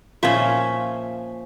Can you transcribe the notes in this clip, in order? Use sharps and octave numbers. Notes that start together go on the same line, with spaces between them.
A#2 F3 C#4 C5 E5